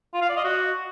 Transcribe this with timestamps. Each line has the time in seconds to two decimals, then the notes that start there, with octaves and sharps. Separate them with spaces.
0.14 F4
0.22 F5
0.29 D5
0.37 D#5
0.44 F#4